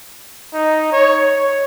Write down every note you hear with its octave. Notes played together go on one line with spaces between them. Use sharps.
D#4
C#5
C#5